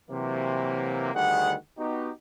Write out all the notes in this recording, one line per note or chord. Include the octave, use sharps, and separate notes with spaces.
C3 E3 F#3 A#3
D2 D#3 G3 G#4 F#5
B3 D#4 F#4 G4